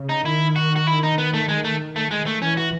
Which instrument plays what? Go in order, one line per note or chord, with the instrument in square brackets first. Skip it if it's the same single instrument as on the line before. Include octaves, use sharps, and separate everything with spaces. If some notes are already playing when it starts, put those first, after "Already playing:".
Already playing: [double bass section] C#3
[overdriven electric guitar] D#4
[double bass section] D#3 [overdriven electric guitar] E4
[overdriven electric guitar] F#4
F#4
E4
D#4
B3
A3
G#3
A3
A3
[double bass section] D#3 [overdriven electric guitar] G#3
[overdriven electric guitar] A3
[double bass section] E3 [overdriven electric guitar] C#4
[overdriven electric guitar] F#4